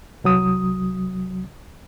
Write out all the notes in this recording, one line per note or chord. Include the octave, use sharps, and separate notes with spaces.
C2 F#3 D#6